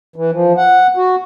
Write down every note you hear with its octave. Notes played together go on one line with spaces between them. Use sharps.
E3
F3
F#5
F#4